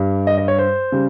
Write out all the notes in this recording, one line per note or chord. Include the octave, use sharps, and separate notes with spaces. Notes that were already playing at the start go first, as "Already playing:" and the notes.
Already playing: G2 G3
D#5
D#5
C#5
C5
C#3 G3